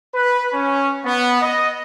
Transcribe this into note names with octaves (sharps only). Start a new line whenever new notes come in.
B4
C#4
B3
D#5